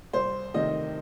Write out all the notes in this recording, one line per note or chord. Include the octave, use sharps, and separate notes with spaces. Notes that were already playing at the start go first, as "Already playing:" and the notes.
C2 C5
C3 D#3 A3 D#5